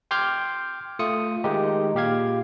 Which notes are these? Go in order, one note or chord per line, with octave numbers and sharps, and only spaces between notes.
G5 C6 D6 F6 G6 G#6
A3 F4 D#6 C#7
D#3 G#3 D#4 G4
A#2 G4 F5 G#6